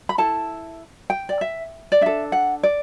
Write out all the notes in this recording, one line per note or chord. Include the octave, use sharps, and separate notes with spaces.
B5
E4 A4 A5
G5
D5
E5
D5
D4 A4 E5
F#5
D5